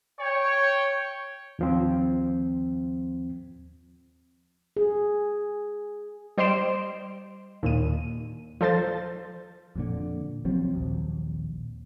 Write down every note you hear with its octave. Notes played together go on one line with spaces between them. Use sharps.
C#5 G5 C#6
D#2 F3 C4
G#4
G3 C5 D#5 C6 D7 E7
D#2 A#2 D#7
F3 A4 C5 A6
F2 A#2 D3
C2 F3 F#3 C4
A#1 D#2